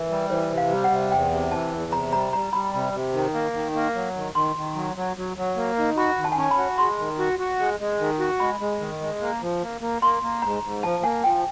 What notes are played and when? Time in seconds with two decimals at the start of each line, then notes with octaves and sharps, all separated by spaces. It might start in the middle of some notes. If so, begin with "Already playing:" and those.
Already playing: E3 A#4
0.10 G3
0.30 E3 C5
0.51 C3
0.58 F5
0.71 G3
0.84 F#5
0.90 C3
1.12 E2 G5
1.31 C3
1.51 E3 A5
1.72 E2
1.92 C3 A#5
2.12 G3 A#5
2.33 G3 A#5
2.53 G3 B5
2.74 C3
2.93 C3
3.13 D#3
3.34 A#3
3.54 D#3
3.75 A#3
3.95 F#3
4.15 D#3
4.35 D#3 C6
4.56 D#3
4.75 F#3
4.96 F#3
5.17 F#3
5.37 F#3
5.56 A#3
5.77 D#3
5.97 F#4 B5
6.17 D#3
6.24 A5
6.32 G#5
6.37 C#4 A5
6.51 B5
6.58 F#4
6.78 G#3 C6
6.98 D#3
7.19 F#4
7.39 F#4
7.60 G#3
7.80 G#3
7.99 D#3
8.20 F#4
8.40 G#3 B5
8.60 G#3
8.80 D#3
9.01 G#3
9.21 A#3
9.42 F3
9.62 A#3
9.81 A#3
10.02 A#3 C6
10.23 A#3
10.42 G#2 A#5
10.63 G#2
10.83 F3 A5
11.03 A#3 G#5
11.24 F3 G5